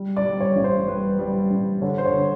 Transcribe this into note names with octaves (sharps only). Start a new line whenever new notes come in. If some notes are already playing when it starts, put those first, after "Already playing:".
Already playing: G3
D5
G3
C#5
A1
C5
G3 B4
G3
A1
D3 C#5
C5
C#5
D3